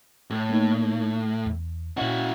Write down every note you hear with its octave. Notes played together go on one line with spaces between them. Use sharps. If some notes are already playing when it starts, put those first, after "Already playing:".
A2
A3 A#3 D#4
E2
A#2 C#4 E4 F#4